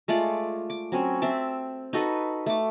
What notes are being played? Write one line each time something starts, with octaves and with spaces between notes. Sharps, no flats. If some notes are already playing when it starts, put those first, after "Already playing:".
G#3 A3 F4 D5
D6
F#3 C4 C#4
C4 E5 G5 A5
D#4 F#4 A4 B4
A3 D6